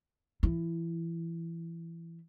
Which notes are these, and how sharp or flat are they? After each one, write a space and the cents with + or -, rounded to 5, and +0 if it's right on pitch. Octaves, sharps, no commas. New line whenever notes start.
E3 +20 E4 +20